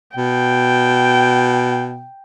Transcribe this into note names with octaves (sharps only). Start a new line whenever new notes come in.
B2 G5